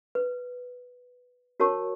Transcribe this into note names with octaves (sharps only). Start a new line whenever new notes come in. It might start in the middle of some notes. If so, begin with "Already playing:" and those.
B4
F#4 A#4 C#5 A5 C#6